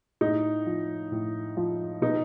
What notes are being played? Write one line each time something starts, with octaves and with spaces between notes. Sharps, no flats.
A2 D#4
F3
A2
F3
B2 D#4